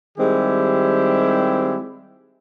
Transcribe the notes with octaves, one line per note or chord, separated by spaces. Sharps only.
D#3 G3 G#3 C4 E4 G4